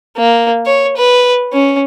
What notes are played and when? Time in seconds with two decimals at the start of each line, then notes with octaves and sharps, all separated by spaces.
0.17 A#3
0.66 C#5
0.97 B4
1.53 C#4